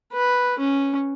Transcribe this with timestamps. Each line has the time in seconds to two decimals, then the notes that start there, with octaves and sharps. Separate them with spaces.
0.13 B4
0.59 C#4